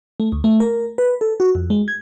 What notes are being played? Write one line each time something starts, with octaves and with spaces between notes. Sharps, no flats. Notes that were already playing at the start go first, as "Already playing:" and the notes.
A3
D2
A3
A#4
B4
A4
F#4
F2
G#3
G#6